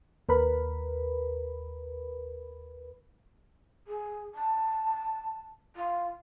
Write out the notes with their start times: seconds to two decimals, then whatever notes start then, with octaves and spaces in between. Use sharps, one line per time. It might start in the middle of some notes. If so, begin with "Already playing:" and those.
0.29 D#2 A#4 B4 B5
3.87 G#4
4.34 A5
5.75 F4